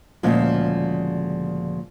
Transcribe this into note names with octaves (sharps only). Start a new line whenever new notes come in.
D2 A#2 C#3 F3 G#3